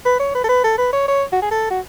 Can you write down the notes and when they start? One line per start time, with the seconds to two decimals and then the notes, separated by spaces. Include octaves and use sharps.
0.06 B4
0.20 C#5
0.35 B4
0.44 A4
0.49 B4
0.64 A4
0.78 B4
0.93 C#5
1.08 C#5
1.33 F#4
1.42 G#4
1.51 A4
1.70 F#4